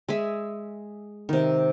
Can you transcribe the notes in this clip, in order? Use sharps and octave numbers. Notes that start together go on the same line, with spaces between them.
G#3 G#4 E5
C3 D#3